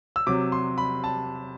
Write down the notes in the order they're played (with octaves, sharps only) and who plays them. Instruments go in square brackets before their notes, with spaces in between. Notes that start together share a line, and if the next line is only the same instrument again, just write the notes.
[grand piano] E6
C3 F#3 D6
C6
B5
A5